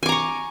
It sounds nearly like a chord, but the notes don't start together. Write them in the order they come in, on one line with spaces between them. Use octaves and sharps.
G#5 D6 A#5 C#6